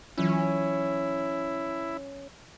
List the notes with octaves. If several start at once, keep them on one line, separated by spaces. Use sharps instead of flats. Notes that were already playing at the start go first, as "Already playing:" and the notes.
E3 F#3 C#4 E4 F4